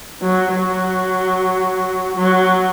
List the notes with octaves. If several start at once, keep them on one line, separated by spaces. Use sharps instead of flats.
F#3
F#3
F#3